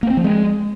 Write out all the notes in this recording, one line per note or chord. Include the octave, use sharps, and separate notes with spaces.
A#3
C4
F3
G#3